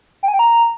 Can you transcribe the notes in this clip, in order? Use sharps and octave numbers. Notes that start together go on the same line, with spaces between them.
G5
G#5
G5
A#5